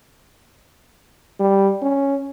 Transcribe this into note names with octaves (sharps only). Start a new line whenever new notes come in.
G3
C#4